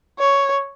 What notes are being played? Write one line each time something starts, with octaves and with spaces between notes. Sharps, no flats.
C#5